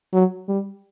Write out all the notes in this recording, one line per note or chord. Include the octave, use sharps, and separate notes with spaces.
F#3
G3